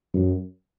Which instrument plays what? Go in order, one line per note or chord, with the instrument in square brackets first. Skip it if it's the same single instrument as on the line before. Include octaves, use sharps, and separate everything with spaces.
[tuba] F#2